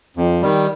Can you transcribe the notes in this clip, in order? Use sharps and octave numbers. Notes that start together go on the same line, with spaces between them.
F2
D#3 G3